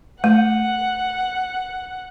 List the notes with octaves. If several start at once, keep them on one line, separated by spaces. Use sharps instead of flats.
A3 F#5